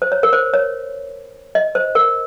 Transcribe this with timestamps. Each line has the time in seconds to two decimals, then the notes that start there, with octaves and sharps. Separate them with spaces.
0.02 C5
0.12 C#5
0.23 A#4
0.33 C5
0.54 C#5
1.55 D#5
1.75 C5
1.95 A#4